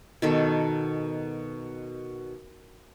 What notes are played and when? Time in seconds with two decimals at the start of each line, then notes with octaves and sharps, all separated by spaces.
0.22 B2 D#3 A4